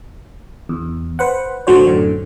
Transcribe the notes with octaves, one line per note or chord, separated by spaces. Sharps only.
E2
B4 C5 F#5
A1 A2 D3 F#3 C5 C#5
F#2 A2 D3